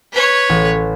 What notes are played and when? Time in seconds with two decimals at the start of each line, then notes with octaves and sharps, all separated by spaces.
0.12 B4 C#5
0.49 A1